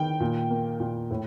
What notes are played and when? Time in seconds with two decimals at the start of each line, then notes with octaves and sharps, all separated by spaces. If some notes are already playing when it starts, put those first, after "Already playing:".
Already playing: D#3 G5
0.20 A#2
0.50 A#3
0.80 A#2
1.11 A2